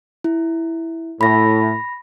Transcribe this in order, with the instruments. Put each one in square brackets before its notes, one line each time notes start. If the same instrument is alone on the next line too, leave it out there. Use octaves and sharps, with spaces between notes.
[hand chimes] E4
[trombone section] A2 [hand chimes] B5 A#6